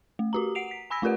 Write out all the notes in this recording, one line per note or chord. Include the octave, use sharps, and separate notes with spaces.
A3
F#4 G4 A#5
F#5 C7 D7 F7
B6
G#5 B5 E6 A#6 B6
A3 F4 G4 A#4 B4 F#5